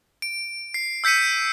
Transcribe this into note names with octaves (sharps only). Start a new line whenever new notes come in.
D7
C7
E6 G6 B6 C#7 D#7